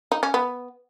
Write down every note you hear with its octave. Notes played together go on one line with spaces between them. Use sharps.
D#4
C#4
B3